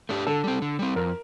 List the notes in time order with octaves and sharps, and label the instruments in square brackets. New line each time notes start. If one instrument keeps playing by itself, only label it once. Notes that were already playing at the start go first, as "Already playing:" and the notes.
[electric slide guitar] A3 D4 G4
[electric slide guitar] D3 [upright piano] A4
[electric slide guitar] G3 C4
D3
G3 C4
[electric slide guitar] F2 [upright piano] A#4